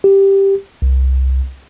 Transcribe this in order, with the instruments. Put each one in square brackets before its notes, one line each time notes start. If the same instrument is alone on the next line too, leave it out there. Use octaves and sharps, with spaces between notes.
[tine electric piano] G4
C2